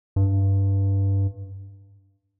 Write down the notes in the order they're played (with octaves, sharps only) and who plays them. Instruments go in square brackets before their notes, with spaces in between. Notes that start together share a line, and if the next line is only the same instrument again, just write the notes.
[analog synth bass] G2